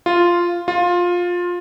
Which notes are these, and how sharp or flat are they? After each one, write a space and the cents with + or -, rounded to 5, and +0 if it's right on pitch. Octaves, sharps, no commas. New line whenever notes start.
F4 -5
F4 +15